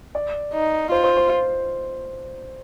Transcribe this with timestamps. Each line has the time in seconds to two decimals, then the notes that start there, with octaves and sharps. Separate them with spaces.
0.15 D5
0.53 D#4
0.91 F4 C5
1.04 C5
1.17 C5